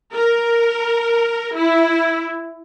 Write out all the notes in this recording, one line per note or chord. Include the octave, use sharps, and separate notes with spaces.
A#4
E4